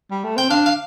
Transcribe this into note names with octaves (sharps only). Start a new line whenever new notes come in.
G3
A3
C4 G5
D4 F5
F5